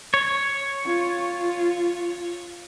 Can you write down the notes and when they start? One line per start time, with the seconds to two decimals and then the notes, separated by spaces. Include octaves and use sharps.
0.14 C#5
0.85 F4